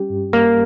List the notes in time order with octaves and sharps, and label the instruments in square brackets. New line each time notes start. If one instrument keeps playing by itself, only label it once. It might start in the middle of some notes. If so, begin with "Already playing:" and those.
Already playing: [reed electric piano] G3 C#4 G4
G2
[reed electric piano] G3 [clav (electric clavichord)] A#3